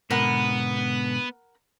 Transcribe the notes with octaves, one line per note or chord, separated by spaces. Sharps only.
G#2 B2 D3 B3 A#4 F#5 B5